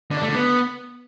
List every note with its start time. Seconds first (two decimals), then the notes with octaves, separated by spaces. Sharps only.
0.11 D3
0.17 D4
0.23 A3
0.29 D3
0.35 B3